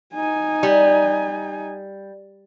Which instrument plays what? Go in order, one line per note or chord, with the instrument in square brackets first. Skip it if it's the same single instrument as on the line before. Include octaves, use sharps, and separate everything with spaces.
[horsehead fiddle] D#4 G#5
[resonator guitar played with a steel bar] G3